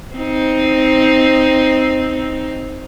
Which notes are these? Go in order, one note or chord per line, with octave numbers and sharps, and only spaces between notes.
C4 D#4